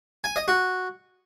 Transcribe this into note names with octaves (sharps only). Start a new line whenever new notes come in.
G#5
D#5
F#4